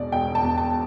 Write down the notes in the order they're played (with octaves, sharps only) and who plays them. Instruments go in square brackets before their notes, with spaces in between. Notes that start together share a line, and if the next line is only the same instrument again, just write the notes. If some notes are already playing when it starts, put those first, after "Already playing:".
Already playing: [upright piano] E1 E2 B2 D5
E1 G5
A5
E2
A5